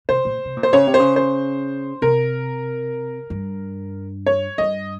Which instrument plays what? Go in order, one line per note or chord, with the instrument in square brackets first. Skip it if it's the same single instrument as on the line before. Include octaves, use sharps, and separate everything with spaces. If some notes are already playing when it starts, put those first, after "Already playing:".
[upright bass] C3 [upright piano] C5
[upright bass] A#2
C3
A#2
[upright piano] C5
[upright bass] C#3 [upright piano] C#5
[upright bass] C3
[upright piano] C5
[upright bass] C#3
[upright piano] C5
[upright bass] C3 [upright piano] A#4
[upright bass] G2
[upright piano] C#5
[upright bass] G2 [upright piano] D#5